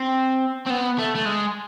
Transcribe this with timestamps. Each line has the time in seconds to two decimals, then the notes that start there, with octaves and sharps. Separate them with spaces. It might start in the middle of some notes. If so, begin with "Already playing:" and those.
Already playing: C4
0.66 C4
0.70 B3
0.98 A3
1.15 A3
1.25 G#3